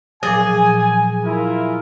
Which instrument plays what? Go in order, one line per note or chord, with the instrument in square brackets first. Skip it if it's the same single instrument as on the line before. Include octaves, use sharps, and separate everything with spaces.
[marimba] A#2 F3 F#3 [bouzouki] G#4 [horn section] G#5
[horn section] E4 F4 A#4